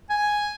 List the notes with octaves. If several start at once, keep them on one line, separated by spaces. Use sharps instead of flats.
G#5